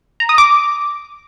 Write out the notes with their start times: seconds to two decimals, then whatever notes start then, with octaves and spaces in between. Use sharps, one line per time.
0.20 A#5
0.29 D#6
0.38 D6